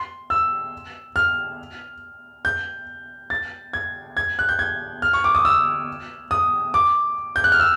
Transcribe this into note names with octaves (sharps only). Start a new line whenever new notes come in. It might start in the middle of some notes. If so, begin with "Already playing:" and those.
Already playing: C6
E6
F6
G6
A6
G#6
G#6
F#6
G6
G#6
F6
C#6
D6
D#6
E6
D#6
D6
G6
F#6
F6
E6